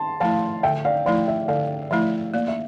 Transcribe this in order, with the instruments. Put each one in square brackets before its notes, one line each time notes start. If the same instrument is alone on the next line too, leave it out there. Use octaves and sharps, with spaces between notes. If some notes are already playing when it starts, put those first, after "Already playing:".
Already playing: [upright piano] A5 C6
[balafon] F3 A3 E4 [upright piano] F5 A5
[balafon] D3 [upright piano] E5 G5
[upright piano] D5 F5
[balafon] F3 A3 E4 [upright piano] D5 F5
[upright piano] E5
[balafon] D3 [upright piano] D5 F5
[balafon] F3 A3 E4 [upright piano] E5
[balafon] A#3 [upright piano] D5
[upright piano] E5